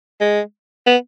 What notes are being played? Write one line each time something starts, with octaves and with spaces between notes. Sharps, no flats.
G#3
B3